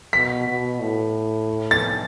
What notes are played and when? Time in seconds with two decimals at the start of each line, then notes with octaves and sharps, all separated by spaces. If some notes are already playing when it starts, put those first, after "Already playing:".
0.13 B2 B6
0.47 B2
0.81 A2
1.71 A6